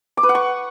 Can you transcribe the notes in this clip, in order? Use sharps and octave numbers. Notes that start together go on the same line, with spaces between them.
D6
B4
F#5
C#6